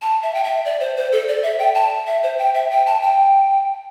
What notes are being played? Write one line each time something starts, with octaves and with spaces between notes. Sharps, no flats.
A5
E5
G5
E5
D5
C5
C5
A4
D5
E5
G5
A5
E5
C5
G5
E5
G5
A5
G5